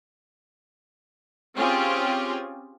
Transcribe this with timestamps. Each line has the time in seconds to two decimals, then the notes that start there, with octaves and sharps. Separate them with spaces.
1.55 C4 C#4 F4 G4 G#4